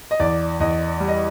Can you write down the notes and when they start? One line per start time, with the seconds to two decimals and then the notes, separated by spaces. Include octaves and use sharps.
0.11 D#5
0.20 E2 D5
0.60 E2 D#5
1.00 G3
1.08 D#5